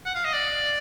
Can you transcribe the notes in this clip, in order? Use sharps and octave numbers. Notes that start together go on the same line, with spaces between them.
F#5
F5
D#5
D5